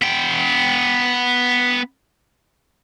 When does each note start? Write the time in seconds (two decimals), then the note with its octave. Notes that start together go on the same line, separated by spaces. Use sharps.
0.02 B3 G5